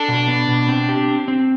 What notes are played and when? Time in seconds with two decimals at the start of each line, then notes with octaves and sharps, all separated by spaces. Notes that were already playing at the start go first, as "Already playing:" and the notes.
Already playing: D4 A4
0.08 B2
0.28 B3
0.48 B2
0.68 C4
0.89 G4
1.08 C4
1.28 C4